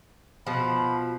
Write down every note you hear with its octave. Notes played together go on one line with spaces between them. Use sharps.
B2 F3 B5